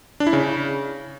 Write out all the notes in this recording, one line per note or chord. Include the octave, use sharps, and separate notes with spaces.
D4
E4
C#3